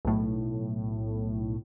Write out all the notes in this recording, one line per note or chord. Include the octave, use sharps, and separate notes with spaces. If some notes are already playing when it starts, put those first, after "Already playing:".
B1 A2